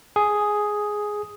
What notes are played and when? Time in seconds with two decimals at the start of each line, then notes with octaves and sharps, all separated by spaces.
0.16 G#4